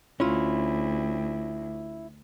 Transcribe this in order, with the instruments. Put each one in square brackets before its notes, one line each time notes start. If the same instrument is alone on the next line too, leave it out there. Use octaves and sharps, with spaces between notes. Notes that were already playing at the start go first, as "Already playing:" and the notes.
[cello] D2 [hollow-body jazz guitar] C#4 E4 F4